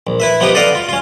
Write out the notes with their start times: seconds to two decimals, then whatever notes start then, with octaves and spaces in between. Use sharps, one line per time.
0.07 A#1
0.20 E4 B4 E5
0.40 F3 B3 D#4 G4 B4
0.55 A4 B4 D5 D#5 F5 F#5
0.75 F4
0.89 C#4 F4